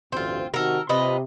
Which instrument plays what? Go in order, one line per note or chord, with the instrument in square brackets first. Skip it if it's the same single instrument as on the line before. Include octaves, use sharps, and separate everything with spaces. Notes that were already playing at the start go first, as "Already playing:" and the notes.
[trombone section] A1 D2 G2 [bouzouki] C4 F4
[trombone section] C3 D#3 F#4 [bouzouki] A4 A#4
[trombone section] C3 [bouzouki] F4 B4 D#5